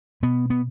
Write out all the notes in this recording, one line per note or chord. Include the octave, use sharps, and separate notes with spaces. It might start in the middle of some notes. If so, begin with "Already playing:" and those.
B2 B3
B3